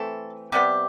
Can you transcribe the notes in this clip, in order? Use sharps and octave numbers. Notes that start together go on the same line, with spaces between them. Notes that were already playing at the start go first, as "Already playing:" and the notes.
Already playing: E3 A3 C4 A4
C3 G3 B3 G4